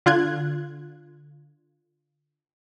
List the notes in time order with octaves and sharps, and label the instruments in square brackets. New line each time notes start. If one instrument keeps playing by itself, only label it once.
[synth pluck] D3 F4 F#6 G#6